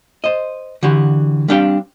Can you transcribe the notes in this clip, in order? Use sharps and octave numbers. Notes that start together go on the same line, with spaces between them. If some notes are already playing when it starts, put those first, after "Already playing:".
C5 D#5
D3 E3 F#4 G4
G3 C4 D4 G4 F5 G5